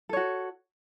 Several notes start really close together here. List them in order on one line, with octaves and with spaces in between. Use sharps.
A4 C#5 F#4